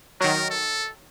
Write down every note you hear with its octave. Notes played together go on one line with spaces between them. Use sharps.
D#3 F#3 A#4
A4